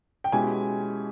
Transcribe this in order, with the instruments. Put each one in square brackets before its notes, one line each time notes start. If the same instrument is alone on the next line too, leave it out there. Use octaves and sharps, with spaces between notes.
[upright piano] G5
[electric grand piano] B2 G#3 C#4 E4 G4 [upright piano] G#5